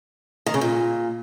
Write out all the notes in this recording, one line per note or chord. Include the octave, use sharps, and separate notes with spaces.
D#3
C#3
A#2